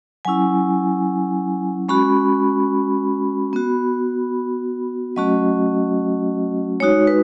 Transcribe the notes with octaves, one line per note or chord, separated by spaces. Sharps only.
F#3 C#4 E4 G#5
G#3 C#4 F#4 B5
B3 F#4
F#3 A3 C#4 F#4 D#5
G#3 D#4 F#4 C#5
B4